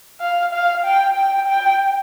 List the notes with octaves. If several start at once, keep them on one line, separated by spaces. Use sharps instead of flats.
F5
F5
G5
G5
G5